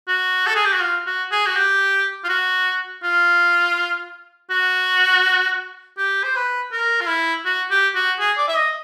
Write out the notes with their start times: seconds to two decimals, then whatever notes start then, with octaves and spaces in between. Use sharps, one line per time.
0.08 F#4
0.46 A4
0.55 G#4
0.65 G4
0.73 F#4
0.81 F4
1.06 F#4
1.31 G#4
1.46 F#4
1.56 G4
2.24 F4
2.29 F#4
3.03 F4
4.50 F#4
5.98 G4
6.23 C5
6.35 B4
6.72 A#4
7.01 F4
7.08 E4
7.45 F#4
7.71 G4
7.95 F#4
8.19 G#4
8.37 D5
8.48 E5
8.57 D#5